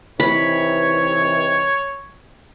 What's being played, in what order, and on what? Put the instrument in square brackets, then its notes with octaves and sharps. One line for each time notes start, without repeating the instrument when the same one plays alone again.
[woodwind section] C3 D#3 E3 [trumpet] C#5 [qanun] B5